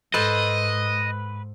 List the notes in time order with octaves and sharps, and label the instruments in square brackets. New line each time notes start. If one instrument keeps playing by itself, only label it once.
[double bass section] G#2 [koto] A4 C5 [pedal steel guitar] B4 [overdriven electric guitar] D#5